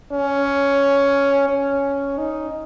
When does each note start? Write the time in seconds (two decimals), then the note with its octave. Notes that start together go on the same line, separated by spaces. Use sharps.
0.12 C#4
1.49 C#4
2.18 D#4